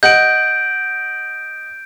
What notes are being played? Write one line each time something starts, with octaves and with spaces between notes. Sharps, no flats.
D#5 F#5 G6 D7 F#7